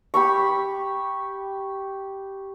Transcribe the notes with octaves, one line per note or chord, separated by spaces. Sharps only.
G4 B5 C#6